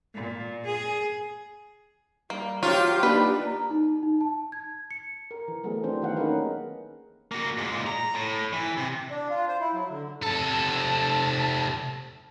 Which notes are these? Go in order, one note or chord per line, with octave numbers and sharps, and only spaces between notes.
A#2
G#4
G3 A#3
F#3 F4 G4 C5
A#3 D4 D#4 G4 B4
A#5
D#4
D#4
A5
G#6
C#7
A#4
E3
F#3 A3 B3 G#4
E3 C4 D4 C5
D#3 B3 G4 F5 F#5
A#3 C#4 D#4 G#4 A#4 B4
A#3 F#4
A#2 G#3
A#5
A2
E3
C3
D4
F4
C5
E4
F#3
D3
C3 A4 A5